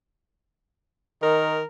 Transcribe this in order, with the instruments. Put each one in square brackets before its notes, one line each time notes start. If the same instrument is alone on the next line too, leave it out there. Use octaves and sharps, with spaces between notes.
[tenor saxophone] D#3 [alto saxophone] A#4